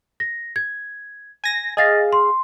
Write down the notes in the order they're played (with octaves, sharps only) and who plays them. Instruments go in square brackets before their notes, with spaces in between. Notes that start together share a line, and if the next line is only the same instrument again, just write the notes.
[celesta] A#6
G#6
[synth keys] G#5 A#6
[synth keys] G#4 F5 [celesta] D#5 A6 A#6
[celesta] C6